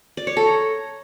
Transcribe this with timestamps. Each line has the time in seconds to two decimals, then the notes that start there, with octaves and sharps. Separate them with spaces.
0.17 D5
0.27 C#5
0.37 A4
0.46 A#5